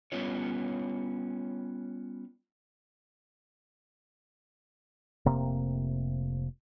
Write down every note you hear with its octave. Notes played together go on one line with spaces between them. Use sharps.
G3 B3 C#4 F4 C#5
F1 C3 A#3